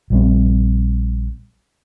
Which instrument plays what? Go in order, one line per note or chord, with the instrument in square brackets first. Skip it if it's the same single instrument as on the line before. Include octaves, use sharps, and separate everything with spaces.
[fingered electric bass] A#1 G3 C4